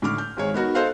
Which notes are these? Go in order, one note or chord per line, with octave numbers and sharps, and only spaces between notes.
A2 D3 D6 F6
G6
G#1 G#3 C#5
B3 D#4 F#4 A#4
A4 C5 D#5 F5 F#6